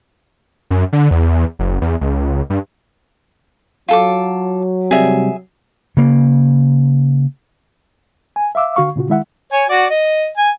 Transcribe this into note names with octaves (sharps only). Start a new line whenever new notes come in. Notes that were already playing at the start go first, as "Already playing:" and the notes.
F#2
D3
E2
F#1
E2
C#2
G2
F#3 F4 A4 D6
C3 G3 G#4 E5
C#3 A#3
G#5
E5 F5 D6 E6
D3 F#4 F5 C#6
A#2 C#3 F4 F#4
D#3 G#3 E4 E5 F#5
C#5 G#5
F#4 D5
D#5
G#5